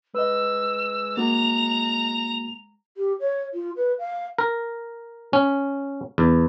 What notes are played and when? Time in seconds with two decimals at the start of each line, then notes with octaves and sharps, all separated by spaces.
0.15 G#3 B4 D#5 E6
1.17 A#3 F#4 A#5 F7
2.97 G4
3.20 C#5
3.54 F4
3.76 B4
3.99 F5
4.38 A#4
5.33 C#4
6.18 E2